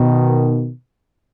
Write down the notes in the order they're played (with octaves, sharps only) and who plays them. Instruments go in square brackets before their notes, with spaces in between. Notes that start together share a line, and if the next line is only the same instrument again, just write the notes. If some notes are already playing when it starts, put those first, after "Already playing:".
Already playing: [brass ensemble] B2 D#3